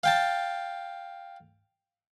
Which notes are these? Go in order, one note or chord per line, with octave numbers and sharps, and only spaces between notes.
F5 G5 A5